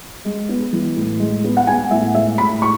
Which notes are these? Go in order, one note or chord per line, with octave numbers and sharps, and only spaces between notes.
G#3
B3
E3
A2
G#3
B3
F#5
B3 G#5
A2 E5
G#3 E5
A2 B5
C#6